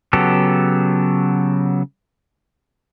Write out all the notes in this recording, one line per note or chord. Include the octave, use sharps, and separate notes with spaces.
C#3 F#3 B3 G4 A4